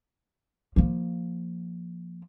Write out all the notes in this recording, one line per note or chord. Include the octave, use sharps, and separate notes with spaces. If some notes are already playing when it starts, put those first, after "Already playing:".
F3 A#3